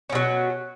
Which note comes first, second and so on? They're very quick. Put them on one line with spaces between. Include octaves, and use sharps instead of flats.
C#4 B2 F#3